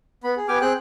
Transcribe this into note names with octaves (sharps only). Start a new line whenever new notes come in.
B3 B5
G#4
B3 G4 G5 G#5 D6 F6
C4 G#4 G5 F#6